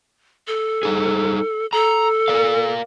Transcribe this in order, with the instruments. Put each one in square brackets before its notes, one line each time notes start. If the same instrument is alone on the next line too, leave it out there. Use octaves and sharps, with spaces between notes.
[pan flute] A4
[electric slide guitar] G3 D#4 G#4
[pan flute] A4 [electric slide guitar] A#5
[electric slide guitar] A#4 D5 F5